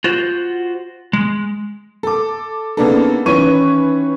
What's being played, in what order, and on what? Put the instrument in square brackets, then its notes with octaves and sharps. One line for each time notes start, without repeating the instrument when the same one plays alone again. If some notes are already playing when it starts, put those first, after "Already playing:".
[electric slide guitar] F4 F#4 C5
G#3
[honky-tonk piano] A4 D6
C#3 A#3 B3 D4 D#4 A4
D#3 E3 C#4 B4 C#6 D#7